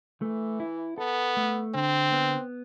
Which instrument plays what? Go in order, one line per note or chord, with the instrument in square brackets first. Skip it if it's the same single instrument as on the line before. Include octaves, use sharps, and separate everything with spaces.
[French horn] E3 [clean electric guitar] A3
[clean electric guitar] E4
[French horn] B3 [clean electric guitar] A4
[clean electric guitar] A3
[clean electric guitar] D3 [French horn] C4
[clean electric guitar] B3